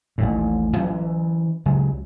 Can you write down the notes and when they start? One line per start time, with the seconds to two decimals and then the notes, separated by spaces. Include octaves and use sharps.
0.18 A1 D#2 A2
0.76 E3 F#3 C#4
1.66 C#2 C#3 F#3